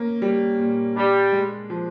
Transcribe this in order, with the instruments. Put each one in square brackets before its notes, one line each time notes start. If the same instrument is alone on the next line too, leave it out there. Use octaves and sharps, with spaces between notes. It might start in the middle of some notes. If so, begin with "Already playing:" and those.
Already playing: [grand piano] A#3 C#4
G3
A#2
[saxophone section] G3 [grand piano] D4
[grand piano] G#3
F3